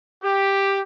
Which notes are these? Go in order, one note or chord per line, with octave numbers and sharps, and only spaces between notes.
G4